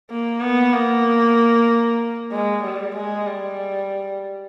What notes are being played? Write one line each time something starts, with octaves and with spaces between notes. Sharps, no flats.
A#3
B3
A#3
G#3
G3
G#3
G3